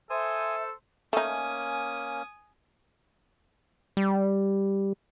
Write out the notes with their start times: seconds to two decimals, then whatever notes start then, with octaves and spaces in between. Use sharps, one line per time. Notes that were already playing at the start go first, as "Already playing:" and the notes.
0.10 A4 C5 E5 G#5 D#6
1.13 A3 A#3 C#4 D#4 G#5 D#6
3.97 G3